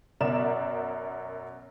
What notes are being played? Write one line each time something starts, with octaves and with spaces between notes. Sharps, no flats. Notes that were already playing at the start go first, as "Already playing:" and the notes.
F#2 B2 A#4 D5 E5 E7